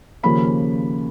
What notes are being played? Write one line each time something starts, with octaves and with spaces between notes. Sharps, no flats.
D#2 C#3 F3 A#3 C#4 B5